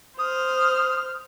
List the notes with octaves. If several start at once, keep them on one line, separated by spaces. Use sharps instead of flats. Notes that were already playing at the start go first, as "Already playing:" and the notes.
C5 D#6 F6